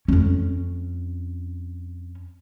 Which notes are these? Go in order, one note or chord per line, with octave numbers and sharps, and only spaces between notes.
F2 C#4